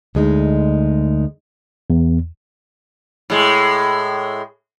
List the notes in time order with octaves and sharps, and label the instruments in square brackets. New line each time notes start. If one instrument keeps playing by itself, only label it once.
[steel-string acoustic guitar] D2 G#3 D#4
[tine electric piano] E2
[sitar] A2 G#3